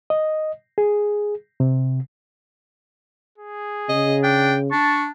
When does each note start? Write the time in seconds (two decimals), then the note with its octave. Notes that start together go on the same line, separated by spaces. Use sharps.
0.10 D#5
0.78 G#4
1.60 C3
3.38 G#4
3.89 C#3 D#5
4.23 D4 G5
4.71 D4 A5 C#6